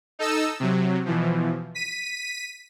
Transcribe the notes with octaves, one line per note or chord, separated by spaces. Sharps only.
D#4 A4 D#5 E6
C3 F#3
B2 E3 F3
B6 D#7